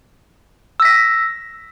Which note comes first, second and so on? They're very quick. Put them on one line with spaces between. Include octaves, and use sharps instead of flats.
E6 A#6 B6